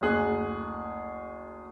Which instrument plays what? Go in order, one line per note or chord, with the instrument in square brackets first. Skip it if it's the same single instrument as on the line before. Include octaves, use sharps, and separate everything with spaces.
[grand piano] F#1 D2 G#4 F#6